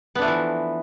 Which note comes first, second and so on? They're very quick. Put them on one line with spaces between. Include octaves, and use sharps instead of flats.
B3 D4 A3 F3 E3